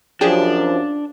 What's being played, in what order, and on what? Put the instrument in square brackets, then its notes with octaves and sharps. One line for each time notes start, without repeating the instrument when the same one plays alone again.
[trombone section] F#2 F3 [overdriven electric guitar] D4 [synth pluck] G4 G#4